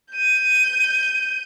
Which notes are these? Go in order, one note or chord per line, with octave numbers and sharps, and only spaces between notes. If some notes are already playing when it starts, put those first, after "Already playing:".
G6 D#7